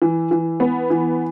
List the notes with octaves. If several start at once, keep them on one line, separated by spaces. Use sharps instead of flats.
E3
E3
B3
E3